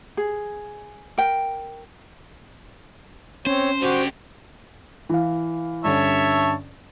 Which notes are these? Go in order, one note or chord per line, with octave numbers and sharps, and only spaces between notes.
G#4
A#4 G5
C4 C#4 C5 C#5
D3 F#4 G4 C5
E3 F5
G2 D3 C#4 C#5 E5 A5